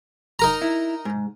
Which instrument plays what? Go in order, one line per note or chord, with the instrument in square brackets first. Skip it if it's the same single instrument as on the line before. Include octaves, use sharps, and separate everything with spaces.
[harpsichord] D#4 A#4 A#5
[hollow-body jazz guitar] E4
G#2